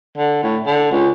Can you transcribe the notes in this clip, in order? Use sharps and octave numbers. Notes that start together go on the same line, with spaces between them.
D3
A2
D3
C#2